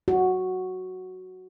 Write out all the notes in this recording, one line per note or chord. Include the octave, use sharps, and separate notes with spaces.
F#4